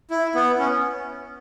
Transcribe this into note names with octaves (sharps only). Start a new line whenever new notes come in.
E4
B3
C#4